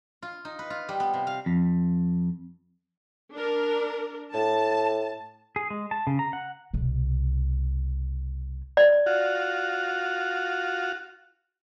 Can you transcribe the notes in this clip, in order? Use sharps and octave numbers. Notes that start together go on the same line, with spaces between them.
F4
D#4
B4
F4
G3
B3
C3
F5
F2
D4 A#4
A2 A5
G#4
G#3
A5
C#3
A#5
F#5
C2 B2
D5
F4 F#4